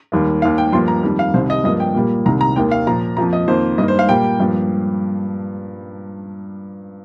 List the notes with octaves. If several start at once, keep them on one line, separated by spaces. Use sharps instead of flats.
D#2 D#3 G3 A#3
D#2 D#3 A#3 F5
G5
G2 F3 A#3 C6
A#5
F2 D#3 G3
F5
C2 C3 D#3 C5
D#5
G2 F3 A#3 D#5
G5
A#2 G3 A#3
C2 C3 D#3 A#5
A#5
D#2 D#3 A#3 G5
F5
A#2 F3 A#3 A#5
F2 F3 A#3 A#5
D#5
F2 D#3 A#3 C5
G2 D#3 A#3 D#5
C5
F5
A#2 G3 A#3 G5
G2 F3 A#3